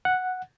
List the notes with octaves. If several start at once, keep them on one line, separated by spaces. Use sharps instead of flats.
F#5